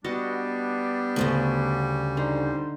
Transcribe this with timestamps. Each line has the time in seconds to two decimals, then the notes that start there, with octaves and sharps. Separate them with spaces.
0.04 G3 B3 D4 F#4 D#5 A5
1.16 D2 A#2 C#3
2.17 D3 D#4 C5